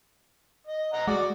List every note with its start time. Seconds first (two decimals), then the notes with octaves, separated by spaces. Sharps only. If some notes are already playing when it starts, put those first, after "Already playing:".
0.67 D#5
0.93 D#5 F#5 A#5
1.08 G#3 F#4 D5